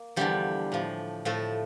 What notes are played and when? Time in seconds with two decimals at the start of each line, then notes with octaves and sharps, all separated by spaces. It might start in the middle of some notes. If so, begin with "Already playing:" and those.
Already playing: A#3
0.16 E2 D3 F3 G3 G4
0.72 A2 F3
1.25 A2 F3 A3 A4